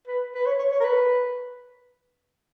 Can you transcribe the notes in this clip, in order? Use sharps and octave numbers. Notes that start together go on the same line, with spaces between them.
B4
B4
C#5
C#5
C#5
A#4
B4